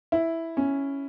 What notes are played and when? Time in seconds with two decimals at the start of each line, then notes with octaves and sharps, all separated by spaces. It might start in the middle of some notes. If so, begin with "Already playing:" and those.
0.12 E4
0.57 C#4